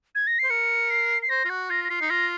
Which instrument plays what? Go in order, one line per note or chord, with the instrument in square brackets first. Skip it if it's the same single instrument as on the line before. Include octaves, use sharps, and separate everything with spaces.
[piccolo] G#6
A#6
[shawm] C5 [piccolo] C7
[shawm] A#4 [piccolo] C#7
[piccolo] C7
C7
[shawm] C5 [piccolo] A#6
[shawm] F4
[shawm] F#4 [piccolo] F#6
[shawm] F4 [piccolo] A#6
[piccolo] A#6
[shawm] F4 [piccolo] C7
[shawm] D#4
[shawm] F4 [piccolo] A#6